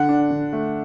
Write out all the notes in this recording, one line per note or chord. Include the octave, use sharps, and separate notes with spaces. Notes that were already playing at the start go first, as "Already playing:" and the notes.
Already playing: D3 F#5
D4
D3
A3